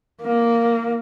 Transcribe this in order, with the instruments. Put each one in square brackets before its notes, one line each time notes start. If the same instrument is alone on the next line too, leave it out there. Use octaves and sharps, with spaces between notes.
[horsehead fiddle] A#3